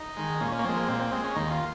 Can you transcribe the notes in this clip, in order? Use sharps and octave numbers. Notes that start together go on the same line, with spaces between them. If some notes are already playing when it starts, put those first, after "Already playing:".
Already playing: D#4
D#3 G#3
A#2 C#4
C#4
A#3
F3 G#3 C4
A#3
A#2 C4
C4
G#3 C4
C#4
D#2 D#4
F4